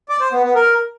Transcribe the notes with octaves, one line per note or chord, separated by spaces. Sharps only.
D5
C5
B3
B3
A#4